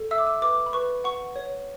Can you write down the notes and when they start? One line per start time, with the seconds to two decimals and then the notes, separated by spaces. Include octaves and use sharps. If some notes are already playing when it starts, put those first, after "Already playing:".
Already playing: A4
0.11 E5 E6
0.18 D6
0.27 E6
0.42 B4 D6
0.66 B5
0.73 B4 C#6
1.04 F#5 C#6
1.36 C#5